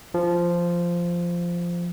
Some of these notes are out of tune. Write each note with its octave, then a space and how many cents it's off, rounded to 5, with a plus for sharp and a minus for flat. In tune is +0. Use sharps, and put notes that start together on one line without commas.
F3 -10